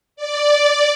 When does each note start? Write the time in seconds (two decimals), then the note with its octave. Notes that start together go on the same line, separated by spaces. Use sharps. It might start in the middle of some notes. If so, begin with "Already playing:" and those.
0.16 D5